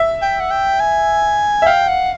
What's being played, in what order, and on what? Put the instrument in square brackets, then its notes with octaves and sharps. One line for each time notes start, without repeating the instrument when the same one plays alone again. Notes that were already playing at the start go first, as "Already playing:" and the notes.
Already playing: [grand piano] E5
[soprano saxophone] G5
F#5
G5
G#5
[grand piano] E5
[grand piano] F5 [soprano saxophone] G5
[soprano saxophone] F#5